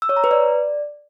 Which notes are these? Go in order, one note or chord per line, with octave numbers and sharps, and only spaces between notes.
E6
C#5
A#5
B4
D5